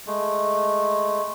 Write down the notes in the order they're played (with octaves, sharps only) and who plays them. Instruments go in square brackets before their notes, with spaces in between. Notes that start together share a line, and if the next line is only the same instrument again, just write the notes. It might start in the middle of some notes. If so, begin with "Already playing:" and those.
[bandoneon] G#3 A3